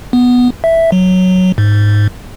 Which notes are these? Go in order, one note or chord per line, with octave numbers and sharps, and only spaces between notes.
B3
E5
F#3
G#2